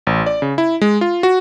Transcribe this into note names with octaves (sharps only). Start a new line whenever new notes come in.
A1
D5
C#3
E4
G#3
F4
F#4